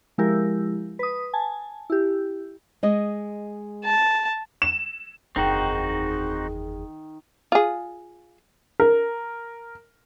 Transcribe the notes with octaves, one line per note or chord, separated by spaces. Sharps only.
F3 G#3 E4 G4 A#4
B4 D#6
G#5 A5
E4 G4
G#3 D#5
A5
E7
F#1 E2 D#3 C4 D#4 F#4 G#4
F4 G#4
A#4